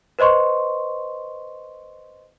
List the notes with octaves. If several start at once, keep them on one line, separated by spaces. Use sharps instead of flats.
B4 C5 D#5 C6 C#6